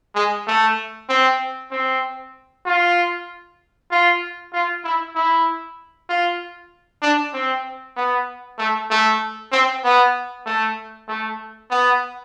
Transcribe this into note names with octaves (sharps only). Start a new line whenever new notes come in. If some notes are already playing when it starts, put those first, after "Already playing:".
G#3
A3
C4
C4
F4
F4
F4
E4
E4
F4
D4
C4
B3
A3
A3
C4
B3
A3
A3
B3